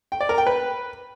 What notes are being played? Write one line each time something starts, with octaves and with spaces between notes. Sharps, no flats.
G5
D5
A#4
G5
B4